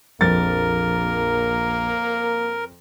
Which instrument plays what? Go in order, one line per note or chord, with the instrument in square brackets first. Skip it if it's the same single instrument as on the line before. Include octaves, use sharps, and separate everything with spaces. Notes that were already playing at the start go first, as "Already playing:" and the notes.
[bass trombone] A#1 [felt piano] F2 A6 [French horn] A#3 [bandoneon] A#4